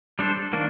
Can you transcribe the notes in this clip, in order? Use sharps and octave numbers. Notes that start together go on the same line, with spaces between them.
G3 D4 A4 C5
D#3 A#3 D4